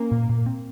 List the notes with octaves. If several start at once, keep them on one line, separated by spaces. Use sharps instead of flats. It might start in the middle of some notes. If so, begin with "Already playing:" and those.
Already playing: A#3 C#4
A#2
A#2
C4